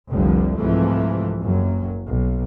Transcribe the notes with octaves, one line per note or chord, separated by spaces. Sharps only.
F1 C2 D3 F3 G3
C2 G#2 C3 E3 F3 A3
F#1 F#2 F#3
B1